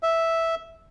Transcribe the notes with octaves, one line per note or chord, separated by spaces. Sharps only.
E5